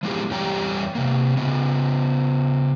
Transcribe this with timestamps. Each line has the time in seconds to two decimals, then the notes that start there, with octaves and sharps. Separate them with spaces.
0.03 F3 G#3 B3 E4 G4 G#4
0.31 E2 G3 G4 C#5 G5 A#5
0.95 C3 A#3
1.37 C#3 B3